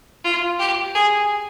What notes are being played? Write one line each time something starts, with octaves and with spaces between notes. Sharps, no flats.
F4
G4
G#4